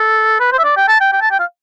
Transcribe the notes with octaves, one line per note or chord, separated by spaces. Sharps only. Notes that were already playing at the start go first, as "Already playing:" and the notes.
Already playing: A4
B4
C5
E5
D5
G5
A5
G5
G5
A5
G5
F5